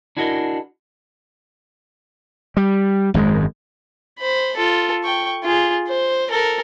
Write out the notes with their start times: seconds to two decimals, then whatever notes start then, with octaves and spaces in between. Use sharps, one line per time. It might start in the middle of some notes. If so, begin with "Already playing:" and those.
0.17 D4 E4 F#4 G#4 A#4 D#5
2.57 G3
3.14 G#1 F#2 D#3 G#3
4.20 C5 B5
4.56 F4 A4
5.04 G5 C#6
5.43 F4 G#4
5.88 C5
6.30 A4 A#4